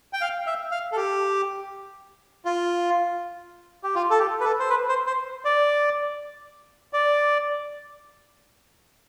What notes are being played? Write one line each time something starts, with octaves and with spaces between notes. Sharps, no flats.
G5
F5
E5
F5
A4
G4
F4
G4
F4
A4
G4
B4
A4
C5
B4
C5
C5
D5
D5